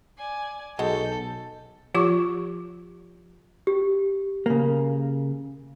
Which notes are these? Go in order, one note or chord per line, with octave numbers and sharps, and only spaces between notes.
D5 G#5
B1 G#3 F#4 A4 G6
F3 F4 G4 C#6 D6
G4
C#3 A#3